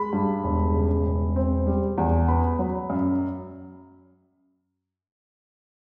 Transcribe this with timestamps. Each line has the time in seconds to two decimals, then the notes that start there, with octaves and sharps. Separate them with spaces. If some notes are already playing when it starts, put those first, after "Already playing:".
Already playing: G#3 B5
0.13 G2
0.44 E1
0.74 C#3
1.06 E1
1.36 C4
1.67 G3
1.98 E2
2.28 B3 B5
2.59 F#3
2.90 F#2